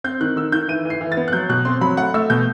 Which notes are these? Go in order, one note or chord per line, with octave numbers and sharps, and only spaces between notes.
C4 G6
D#3 F#6
D#3 E6
D#3 G6
E3 D#7
E3
C7
E3
A6
B3
F#6
F#3 G6
B2 F#6
C4 C6
F#3 B5
A3 F#5
A3 E6
B2 G6